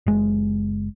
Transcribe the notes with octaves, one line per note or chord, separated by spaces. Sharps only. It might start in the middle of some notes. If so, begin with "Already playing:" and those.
F#1 G#3